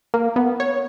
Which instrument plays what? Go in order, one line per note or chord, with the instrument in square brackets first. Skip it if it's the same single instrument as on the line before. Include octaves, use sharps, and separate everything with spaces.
[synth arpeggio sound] A#3
B3
C#5